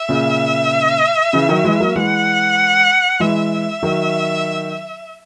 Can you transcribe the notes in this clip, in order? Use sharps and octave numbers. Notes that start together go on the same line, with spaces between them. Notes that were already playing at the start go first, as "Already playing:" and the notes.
Already playing: E5
A#2 C#3
C#3 E3
D#3 F#3
E3 G#3
F#3 A#3
E3 G#3 F#5
E3 G#3 E5
D#3 F#3